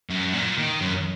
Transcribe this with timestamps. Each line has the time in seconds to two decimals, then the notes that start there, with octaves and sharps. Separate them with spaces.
0.10 F#2
0.33 A#2
0.58 D#3
0.81 F#2